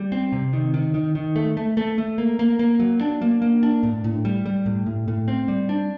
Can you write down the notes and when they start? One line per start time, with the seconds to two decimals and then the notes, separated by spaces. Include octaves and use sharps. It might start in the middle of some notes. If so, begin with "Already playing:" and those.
Already playing: G3
0.12 C4
0.32 C3
0.53 D#3
0.74 D#3
0.94 D#3
1.15 D#3
1.36 A3
1.57 A3
1.77 A3
1.98 A3
2.18 A#3
2.39 A#3
2.59 A#3
2.80 F#3
3.01 D4
3.22 A#3
3.42 A#3
3.63 D4
3.83 A2
4.04 A2
4.25 G3
4.46 G3
4.66 A2
4.86 A2
5.08 A2
5.28 C4
5.48 G3
5.69 D4